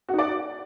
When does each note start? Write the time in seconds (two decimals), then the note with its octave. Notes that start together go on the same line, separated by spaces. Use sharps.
0.09 F#4
0.14 D#4
0.19 D5